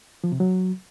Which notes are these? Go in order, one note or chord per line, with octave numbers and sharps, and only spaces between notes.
F3
C3
F#3